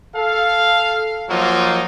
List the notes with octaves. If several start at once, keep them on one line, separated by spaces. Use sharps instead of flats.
A4 F5
F3 F#3 A#3 D#4 F4